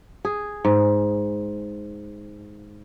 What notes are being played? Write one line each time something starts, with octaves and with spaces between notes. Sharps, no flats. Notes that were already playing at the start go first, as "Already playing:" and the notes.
G#4
G#2